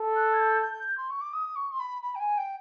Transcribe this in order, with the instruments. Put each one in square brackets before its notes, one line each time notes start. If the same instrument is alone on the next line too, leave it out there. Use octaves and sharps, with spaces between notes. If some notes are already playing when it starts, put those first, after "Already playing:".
Already playing: [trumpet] A4
[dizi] F#6
G#6
G6
G6
C6
C#6
D6
D#6
C#6
C6
B5
B5
G5
G#5
G5